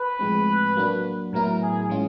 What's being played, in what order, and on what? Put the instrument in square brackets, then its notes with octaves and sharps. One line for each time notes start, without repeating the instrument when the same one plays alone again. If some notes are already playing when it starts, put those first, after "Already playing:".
Already playing: [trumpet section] B4
[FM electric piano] A2 F3 G#3 C4
F#3 A#3 D4 F#4
[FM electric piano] A2 F#3 B3 E4 [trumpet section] A#4
[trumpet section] G#4
[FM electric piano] E3 G#3 C#4 F4